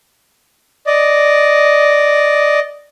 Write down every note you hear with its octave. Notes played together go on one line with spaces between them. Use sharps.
D5 D#5